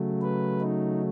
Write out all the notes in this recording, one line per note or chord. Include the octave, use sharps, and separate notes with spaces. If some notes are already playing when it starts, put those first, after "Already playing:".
Already playing: C#3 F#3 A3
B4
D#4